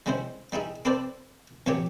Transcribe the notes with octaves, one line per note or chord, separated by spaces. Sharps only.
G3 G#3 C#4 E4 C5
G3 D#4 E4 G#4
C4 A4 B4 C5 D5 A5
F2 A#2 E3 F#3 G4 C#5